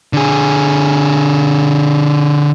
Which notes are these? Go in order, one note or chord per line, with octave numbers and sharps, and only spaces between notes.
D3 G#4